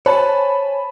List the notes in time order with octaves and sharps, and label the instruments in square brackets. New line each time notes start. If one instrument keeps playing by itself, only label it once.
[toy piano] C5 [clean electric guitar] C#5 [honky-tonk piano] G#5 A5 B5